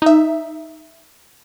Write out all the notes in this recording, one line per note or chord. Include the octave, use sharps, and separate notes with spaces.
D#4 E5